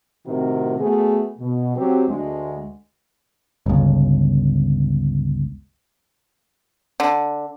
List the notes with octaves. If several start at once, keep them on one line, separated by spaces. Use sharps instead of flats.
A2 C3 D#3 C4 F#4 A#4
A3 B3 F#4 G#4
B2
F#3 C4 G4
D2 G#3
G1 C#2
D3